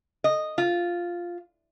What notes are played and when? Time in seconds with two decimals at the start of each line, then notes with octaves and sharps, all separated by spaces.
0.24 D#5
0.58 F4